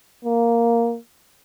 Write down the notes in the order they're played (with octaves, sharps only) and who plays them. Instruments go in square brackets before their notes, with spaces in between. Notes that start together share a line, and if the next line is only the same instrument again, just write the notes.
[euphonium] A#3